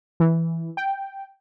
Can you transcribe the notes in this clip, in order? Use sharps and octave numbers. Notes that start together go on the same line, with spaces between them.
E3
G5